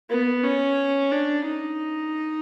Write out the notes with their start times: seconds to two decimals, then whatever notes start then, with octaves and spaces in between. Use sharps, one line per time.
0.10 B3
0.44 C#4
1.11 D4
1.45 D#4